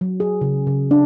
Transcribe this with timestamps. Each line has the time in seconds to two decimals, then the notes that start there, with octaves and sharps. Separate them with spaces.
0.01 F#3
0.20 G#4
0.41 C#3
0.67 C#3
0.91 D4